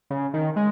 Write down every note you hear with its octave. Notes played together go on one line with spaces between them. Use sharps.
C#3
D#3
G#3